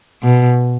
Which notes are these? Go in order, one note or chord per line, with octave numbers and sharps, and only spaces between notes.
B2